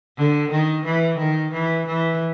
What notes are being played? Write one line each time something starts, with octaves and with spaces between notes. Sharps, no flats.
D3
D#3
E3
D#3
E3
E3